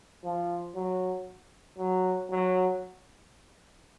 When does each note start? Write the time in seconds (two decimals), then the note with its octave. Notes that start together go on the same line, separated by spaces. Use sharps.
0.24 F3
0.75 F#3
1.78 F#3
2.31 F#3